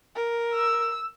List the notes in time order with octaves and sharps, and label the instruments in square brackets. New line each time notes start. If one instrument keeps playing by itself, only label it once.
[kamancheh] A#4
[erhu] E6